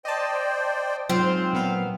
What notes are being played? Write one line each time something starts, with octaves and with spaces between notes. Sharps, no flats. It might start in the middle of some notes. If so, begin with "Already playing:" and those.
C5 D5 D#5 G5 A5
G#2 F#3 C4 F4 F5
A#2 B3 F5